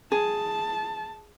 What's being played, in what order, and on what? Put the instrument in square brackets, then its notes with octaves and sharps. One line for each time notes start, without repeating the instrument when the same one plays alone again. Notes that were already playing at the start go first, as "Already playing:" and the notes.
[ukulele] G#4 [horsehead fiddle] A5